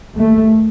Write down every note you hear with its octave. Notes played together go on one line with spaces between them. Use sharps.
D#2 A3